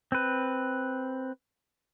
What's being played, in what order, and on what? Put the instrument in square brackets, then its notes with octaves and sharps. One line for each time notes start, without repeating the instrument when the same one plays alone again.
[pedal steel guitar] C4 B4